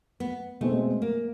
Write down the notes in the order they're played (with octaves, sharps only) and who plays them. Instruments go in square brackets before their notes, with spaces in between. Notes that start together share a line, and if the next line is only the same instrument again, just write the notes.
[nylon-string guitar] B3
[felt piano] B2 G#3 C4 [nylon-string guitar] A3
[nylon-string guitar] A#3